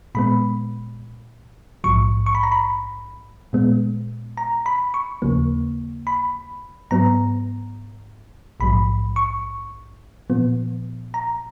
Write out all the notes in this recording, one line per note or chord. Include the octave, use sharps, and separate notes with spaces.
A#2 G#3 B3 B5
A#1 G#2 F3 C#6
C#6
B5
A#5
B5
A#2 G#3 B3
A#5
B5
C#6
D#2 C#3 F3 A#3
B5
G#2 F#3 B3 A#5
A#1 G#2 F3 B5
C#6
A#2 F3 B3
A#5